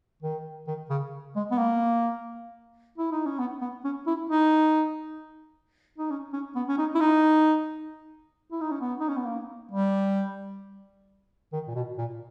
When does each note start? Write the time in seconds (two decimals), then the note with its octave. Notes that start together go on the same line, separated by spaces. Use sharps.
0.22 D#3
0.67 D#3
0.90 C#3
1.36 G#3
1.51 B3
1.58 A#3
2.98 E4
3.12 D#4
3.26 C#4
3.39 B3
3.61 B3
3.84 C#4
4.07 E4
4.30 D#4
5.98 D#4
6.10 C#4
6.33 C#4
6.55 B3
6.68 C#4
6.78 D#4
6.95 E4
7.00 D#4
8.51 E4
8.61 D#4
8.71 C#4
8.80 B3
9.00 D#4
9.08 C#4
9.17 B3
9.26 A#3
9.71 G3
11.53 D#3
11.67 A#2
11.75 B2
11.98 A#2